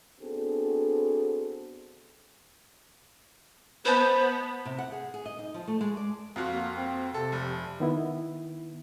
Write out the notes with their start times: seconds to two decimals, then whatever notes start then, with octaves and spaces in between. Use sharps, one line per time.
0.21 B3 C4 D4 F#4 G#4 A4
3.85 B3 B4 C5 D#5 A5
4.65 C3
4.78 F#5
4.92 G#4
5.14 G#4
5.26 D#5
5.39 D#4
5.54 F3
5.68 A3
5.81 G#3
5.97 D5
6.36 F2 F4 F#4
6.52 A#3
6.77 C4
7.14 C3 A4
7.32 F1
7.80 D#3 B3 E4